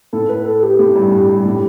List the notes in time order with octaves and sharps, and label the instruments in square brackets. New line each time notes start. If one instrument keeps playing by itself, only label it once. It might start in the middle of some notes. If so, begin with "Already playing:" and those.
[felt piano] A2 [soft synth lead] A4
[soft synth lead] B4
A4
G4
[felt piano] A2 [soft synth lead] G4
[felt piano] G2
G2
G2
A2